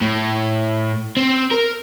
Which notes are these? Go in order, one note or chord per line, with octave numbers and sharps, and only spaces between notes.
A2
C4
A#4